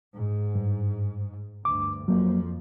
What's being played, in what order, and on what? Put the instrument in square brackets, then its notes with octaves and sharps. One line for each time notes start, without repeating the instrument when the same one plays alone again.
[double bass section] G#2
[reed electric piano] G2
[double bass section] D2 G2 [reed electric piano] D6
[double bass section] F2 F3 [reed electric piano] F#3 A#3